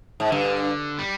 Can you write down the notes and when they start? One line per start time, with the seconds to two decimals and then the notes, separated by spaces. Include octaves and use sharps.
0.20 G#2
0.32 G2 D3
0.99 G3